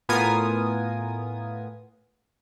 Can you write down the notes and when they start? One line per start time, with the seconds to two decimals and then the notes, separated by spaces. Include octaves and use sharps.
0.09 A2 B3 F4 A#4 G#5 D#6